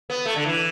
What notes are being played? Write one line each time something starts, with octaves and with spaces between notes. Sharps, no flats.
B3
A3
D3
E3